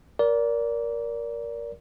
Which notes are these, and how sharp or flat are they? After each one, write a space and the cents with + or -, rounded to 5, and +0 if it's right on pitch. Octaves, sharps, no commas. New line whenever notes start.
A#4 +15 D5 -25